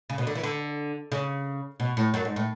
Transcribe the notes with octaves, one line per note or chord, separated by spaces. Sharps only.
C#3
B2
D3
E3
D3
C#3
B2
A2
F#2
G#2
A2